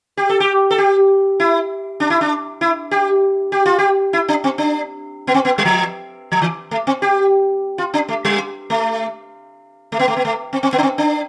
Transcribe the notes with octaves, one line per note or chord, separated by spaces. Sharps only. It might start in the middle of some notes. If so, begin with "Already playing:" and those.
G4
A4
G4
A4
G4
E4
D4
E4
D4
E4
G4
G4
F4
G4
E4
D4
C4
D4
B3
C4
B3
G3
F3
F3
E3
A3
C4
G4
F4
D4
A3
G3
A3
A3
B3
A3
B3
A3
C4
C4
B3
D4
C4
D4